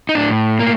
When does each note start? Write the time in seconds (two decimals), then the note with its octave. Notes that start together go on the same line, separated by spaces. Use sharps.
0.09 D#4
0.15 A2 D4
0.59 A#3